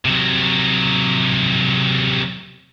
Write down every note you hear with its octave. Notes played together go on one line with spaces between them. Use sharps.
C3 F#3